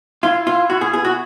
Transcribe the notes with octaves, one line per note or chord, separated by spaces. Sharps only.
E4 F4
E4 F4
E4 F#4
G#4
B3 G#4
F#4